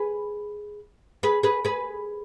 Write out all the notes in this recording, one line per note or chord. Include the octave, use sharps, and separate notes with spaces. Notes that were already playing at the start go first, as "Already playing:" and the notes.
Already playing: G#4 B4
G#4 B4
G#4 B4
G#4 B4